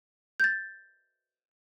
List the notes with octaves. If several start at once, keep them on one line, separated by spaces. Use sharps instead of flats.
G6 A6